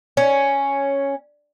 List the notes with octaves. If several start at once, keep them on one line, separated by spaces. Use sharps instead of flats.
C#4